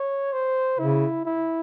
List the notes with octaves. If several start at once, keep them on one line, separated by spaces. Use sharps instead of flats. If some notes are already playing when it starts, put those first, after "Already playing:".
Already playing: C#5
C5
C#3 E4
E4